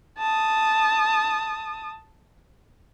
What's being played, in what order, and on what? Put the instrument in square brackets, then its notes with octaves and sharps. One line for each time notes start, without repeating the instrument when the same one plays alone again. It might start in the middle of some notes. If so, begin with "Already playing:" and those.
[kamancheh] A5 D#6